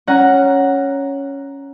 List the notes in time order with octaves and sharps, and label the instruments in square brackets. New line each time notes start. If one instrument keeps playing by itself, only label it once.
[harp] C#4 F#5 A#5